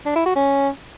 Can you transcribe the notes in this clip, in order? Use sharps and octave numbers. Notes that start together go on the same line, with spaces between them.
D4
E4
F#4
C#4